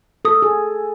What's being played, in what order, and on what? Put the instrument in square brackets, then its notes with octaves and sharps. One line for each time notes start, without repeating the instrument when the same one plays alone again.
[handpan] A4 [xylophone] D#6
[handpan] G#4